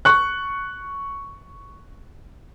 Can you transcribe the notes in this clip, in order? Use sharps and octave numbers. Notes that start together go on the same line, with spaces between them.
C#6 F#6